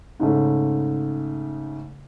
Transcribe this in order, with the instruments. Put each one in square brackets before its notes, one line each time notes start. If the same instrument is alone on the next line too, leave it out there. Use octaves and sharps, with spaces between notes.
[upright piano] G#2 C#3 A3